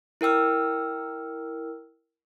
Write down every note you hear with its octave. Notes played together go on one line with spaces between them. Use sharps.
E4 A#4 G5 E6 F6